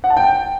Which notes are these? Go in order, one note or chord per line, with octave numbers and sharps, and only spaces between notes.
F#5
A5
G5